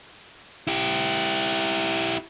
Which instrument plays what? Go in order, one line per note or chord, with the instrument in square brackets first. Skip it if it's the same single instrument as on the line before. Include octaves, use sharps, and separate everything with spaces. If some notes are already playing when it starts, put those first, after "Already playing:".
[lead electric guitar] E4 G4